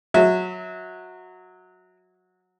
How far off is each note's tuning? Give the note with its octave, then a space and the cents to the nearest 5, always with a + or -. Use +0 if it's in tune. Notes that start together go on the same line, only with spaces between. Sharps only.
F#3 -15 E5 -30